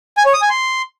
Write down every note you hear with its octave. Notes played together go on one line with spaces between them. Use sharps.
G#5
C#5
D#6
G#5
C6